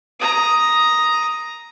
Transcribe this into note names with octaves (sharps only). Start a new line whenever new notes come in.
A#5 D#6